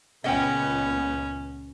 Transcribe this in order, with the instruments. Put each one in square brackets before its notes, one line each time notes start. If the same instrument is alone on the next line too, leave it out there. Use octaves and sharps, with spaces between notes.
[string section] C#2 A#2 B3 [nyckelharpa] C#4 [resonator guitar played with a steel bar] D#5 F#5 G5